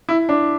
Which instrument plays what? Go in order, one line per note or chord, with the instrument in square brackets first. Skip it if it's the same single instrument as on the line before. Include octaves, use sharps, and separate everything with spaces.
[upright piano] E4
D4